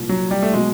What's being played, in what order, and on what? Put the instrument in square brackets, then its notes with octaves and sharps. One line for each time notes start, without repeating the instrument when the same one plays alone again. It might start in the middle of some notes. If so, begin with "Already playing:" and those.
Already playing: [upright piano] C2 A#2 F3
[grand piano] F#3
G3
A3
[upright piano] B2 F#3 [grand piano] G#3